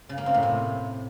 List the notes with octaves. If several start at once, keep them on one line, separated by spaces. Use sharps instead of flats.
C#3
A#3
C4
A2
C3